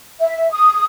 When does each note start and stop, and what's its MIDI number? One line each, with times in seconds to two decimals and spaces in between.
0.20 0.49 76
0.51 0.84 87